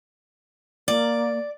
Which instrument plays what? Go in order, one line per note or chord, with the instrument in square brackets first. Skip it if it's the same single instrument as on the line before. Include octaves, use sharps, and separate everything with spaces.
[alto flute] A#3 [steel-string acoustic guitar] D5